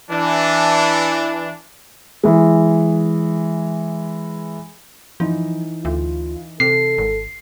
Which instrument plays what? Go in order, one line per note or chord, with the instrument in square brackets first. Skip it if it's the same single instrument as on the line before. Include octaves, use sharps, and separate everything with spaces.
[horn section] E3 D4
[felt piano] E3 G#3
[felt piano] E3 D#4 [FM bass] F3
[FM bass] D2 [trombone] F4
[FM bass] C3 [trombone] A4 [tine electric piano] C7
[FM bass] G#1